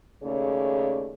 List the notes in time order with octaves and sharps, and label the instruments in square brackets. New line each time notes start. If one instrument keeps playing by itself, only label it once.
[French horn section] D#2 C#3 A3 G#4 C#5 D5